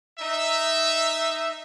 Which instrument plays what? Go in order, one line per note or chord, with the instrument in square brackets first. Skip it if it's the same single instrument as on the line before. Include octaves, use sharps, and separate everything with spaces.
[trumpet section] D#4 E5